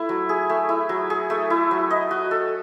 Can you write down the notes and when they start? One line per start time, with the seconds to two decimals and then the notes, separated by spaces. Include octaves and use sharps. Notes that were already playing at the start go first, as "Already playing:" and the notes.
Already playing: A3 E4
0.09 F#3
0.29 G#4
0.50 A3
0.69 E4
0.89 F#3
1.10 G#4
1.30 A3
1.50 E4
1.71 F#3
1.91 D#5
2.11 F#4
2.31 A4